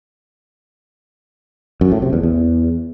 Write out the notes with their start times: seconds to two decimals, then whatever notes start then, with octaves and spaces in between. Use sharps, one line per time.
1.81 F#2
1.92 A2
2.02 C3
2.13 E2
2.23 E2